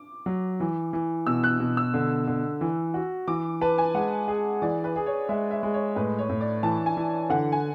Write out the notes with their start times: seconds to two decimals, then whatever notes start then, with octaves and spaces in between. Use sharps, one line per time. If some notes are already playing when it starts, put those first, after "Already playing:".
Already playing: D6
0.26 F#3
0.60 E3
0.93 E3
1.27 B2 E6
1.44 F#6
1.60 B2
1.77 E6
1.94 D3
2.27 D3
2.61 E3
2.94 F#4
3.27 E3 D6
3.61 B4 A5
3.78 G#5
3.94 G#3 F#5
4.28 G#4
4.62 E3 D5
4.84 B4
4.96 G#4
5.06 C#5
5.29 G#3 E5
5.51 E5
5.63 G#3
5.74 C#5
5.96 A2 B4
6.18 C#5
6.29 A2
6.41 D5
6.63 E3 A5
6.86 G#5
6.97 E3
7.30 D3 F#5
7.52 G#5